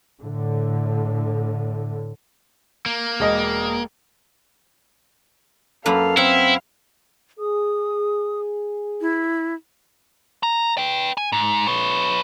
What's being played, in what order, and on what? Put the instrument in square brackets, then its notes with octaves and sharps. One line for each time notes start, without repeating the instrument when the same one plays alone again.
[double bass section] A2 D3
[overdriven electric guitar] A#3
[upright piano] E1 D#5
[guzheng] F#2 A#3 B4 [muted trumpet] A4 [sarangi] F5
[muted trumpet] C4 [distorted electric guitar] E4 [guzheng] F#5
[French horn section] G#4 [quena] D#6
[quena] E4
[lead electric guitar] A#5
B4 G5
G#5
G#2
B4 C#5